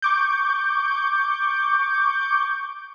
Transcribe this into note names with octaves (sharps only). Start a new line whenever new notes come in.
C#6 D6 G6